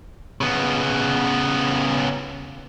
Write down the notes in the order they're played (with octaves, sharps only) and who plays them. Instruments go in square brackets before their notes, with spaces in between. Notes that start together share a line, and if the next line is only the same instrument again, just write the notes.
[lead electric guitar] C#3 B3